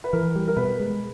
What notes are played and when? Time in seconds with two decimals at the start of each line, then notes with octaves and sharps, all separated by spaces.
0.04 B4
0.13 E3 A#4
0.36 G3
0.48 A#4
0.56 B2 B4
0.80 G#3